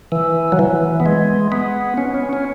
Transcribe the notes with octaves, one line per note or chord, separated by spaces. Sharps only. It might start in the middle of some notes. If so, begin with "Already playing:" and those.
E3
F#3
E3
B3
G#3
B3
C#4
C#4
C#4